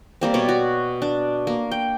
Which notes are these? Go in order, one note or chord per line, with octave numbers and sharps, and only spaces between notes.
G3 A#3 C4
B2 C#5 D5
F#4
D4
A#3
G5